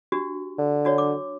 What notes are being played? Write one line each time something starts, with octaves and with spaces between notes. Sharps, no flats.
D4 F#4 G4
D3
D4 F#4 C#5
D6